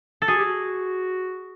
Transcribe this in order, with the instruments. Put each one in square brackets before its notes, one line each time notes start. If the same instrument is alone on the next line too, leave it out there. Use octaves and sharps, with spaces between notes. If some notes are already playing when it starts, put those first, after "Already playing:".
[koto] A4
[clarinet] F#4 [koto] G#4
[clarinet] G4
F#4